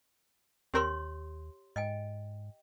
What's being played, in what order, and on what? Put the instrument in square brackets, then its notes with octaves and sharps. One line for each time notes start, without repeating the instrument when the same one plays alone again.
[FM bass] D#2 [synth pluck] C4 A#4 E6 [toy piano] G4 C#5 C6
[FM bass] G#2 [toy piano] D#5 G5 G#5